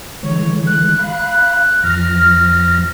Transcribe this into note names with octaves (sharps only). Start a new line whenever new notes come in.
D3 E3 G#3 C#5
F#6
F5 B5
F2 F3 F6 A#6